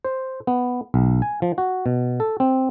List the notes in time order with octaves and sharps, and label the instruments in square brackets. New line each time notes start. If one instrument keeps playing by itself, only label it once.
[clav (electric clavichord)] C5
B3
B1
G#5
F3
F#4
B2
A4
C4